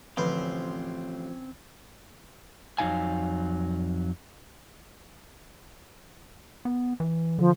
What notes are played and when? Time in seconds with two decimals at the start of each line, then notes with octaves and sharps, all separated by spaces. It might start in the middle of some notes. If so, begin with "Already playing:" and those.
0.17 A1 D3 F3 C4 C#4 B4 C5 B5
2.78 F2 F#3 D#4 F5 G#5
6.65 B3
7.00 E3
7.39 D3 F3